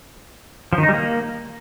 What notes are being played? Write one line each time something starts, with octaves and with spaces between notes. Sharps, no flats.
F3
D#3
D#4
G3
A#3